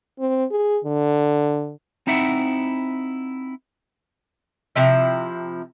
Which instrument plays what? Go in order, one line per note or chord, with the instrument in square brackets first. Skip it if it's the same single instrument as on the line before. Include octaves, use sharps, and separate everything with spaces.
[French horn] C4
G#4
D3
[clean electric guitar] C4 D#4 E4 E5 F#5
[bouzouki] C3 F3 E4